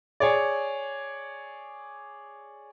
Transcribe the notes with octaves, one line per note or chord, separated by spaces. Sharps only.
G#4 C#5 D5